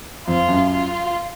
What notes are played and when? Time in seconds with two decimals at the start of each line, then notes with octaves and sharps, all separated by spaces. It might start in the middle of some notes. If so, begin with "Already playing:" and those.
0.27 F2 F4
0.49 F#2
0.70 F4